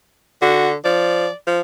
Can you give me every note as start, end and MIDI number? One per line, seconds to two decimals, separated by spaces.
0.42 0.75 50
0.42 0.69 66
0.85 1.28 53
0.85 1.34 74
1.47 1.61 53